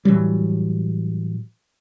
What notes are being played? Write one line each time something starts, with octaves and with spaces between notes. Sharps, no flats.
A2 E3 F#3 G3